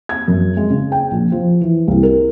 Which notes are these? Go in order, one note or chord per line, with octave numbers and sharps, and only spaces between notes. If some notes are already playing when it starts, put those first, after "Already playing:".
G#6
F#2
G#3
C#3
G5
A#1
F3
E3
C2
A#4